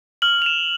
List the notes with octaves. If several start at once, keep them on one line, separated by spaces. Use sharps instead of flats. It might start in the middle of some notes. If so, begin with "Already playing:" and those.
F6 F#7
F7
E7